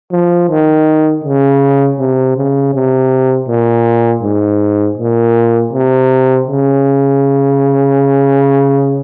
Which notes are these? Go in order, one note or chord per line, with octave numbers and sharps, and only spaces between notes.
F3
D#3
C#3
C3
C#3
C3
A#2
G#2
A#2
C3
C#3